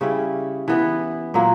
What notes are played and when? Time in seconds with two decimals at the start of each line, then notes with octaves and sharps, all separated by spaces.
0.01 C#3 G3 C#4 E4
0.68 E3 B3 E4 B4
1.34 A#2 F#3 A#3